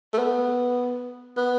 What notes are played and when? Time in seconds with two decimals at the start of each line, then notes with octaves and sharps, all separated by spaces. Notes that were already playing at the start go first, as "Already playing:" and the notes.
0.13 A3
0.18 B3
1.38 B3